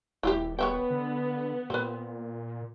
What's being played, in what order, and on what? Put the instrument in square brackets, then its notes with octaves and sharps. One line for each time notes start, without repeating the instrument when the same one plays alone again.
[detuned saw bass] D#1 [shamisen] E4 F4 G4
[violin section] B3 [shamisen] C#5 E5 G5
[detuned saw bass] D3
[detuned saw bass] A#2 [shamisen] C4 B4